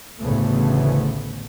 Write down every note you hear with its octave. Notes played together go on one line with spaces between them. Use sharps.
A1 D2 C#3 E3 A3 B3